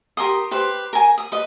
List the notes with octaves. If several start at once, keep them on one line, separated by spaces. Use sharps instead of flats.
G4 A#4 C6 D#6
G4 B4 C5
A#4 G#5
D#6
B4 D#5